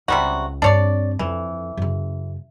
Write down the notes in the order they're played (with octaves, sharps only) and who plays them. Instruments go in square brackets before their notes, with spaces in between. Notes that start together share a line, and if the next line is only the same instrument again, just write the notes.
[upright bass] C#2 [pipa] C3 G3 F#4
[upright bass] G2 C4 [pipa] D4 C#5 D5
[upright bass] F2 D3 [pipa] E3
[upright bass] F#2 C#3